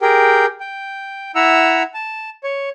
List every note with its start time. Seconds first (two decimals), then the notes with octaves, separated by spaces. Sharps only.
0.02 G4 G#4 A#4 G5
0.60 G5
1.35 E4 E5 F#5 A#5 E6
1.94 A5
2.44 C#5